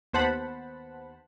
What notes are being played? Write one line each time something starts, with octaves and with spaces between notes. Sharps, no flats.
D#2 B3 C5 F#5 A5 B5